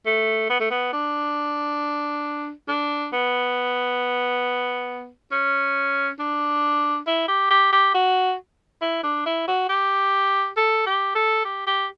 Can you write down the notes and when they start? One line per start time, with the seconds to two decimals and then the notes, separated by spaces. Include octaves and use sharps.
0.06 A3
0.49 B3
0.60 A3
0.71 B3
0.93 D4
2.68 D4
3.12 B3
5.32 C#4
6.19 D4
7.07 E4
7.28 G4
7.50 G4
7.72 G4
7.94 F#4
8.82 E4
9.04 D4
9.26 E4
9.48 F#4
9.69 G4
10.57 A4
10.86 G4
11.15 A4
11.45 G4
11.67 G4